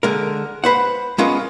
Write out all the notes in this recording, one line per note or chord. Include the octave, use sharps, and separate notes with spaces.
D3 G#3 A#4
B4 C5 F#5
G#3 B3 C#4 F4 A#4